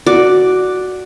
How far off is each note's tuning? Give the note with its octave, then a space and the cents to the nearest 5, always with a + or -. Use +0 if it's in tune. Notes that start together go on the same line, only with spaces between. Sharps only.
F#4 +0 D5 +0